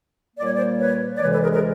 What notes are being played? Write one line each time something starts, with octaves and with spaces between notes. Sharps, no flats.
A#2 G3 A#3 D5
C#5
C5 D5
B4 C#5
D5
D2 C3 E3 G#3 B4 C#5
A4 B4
G#4 A#4
G#4 A#4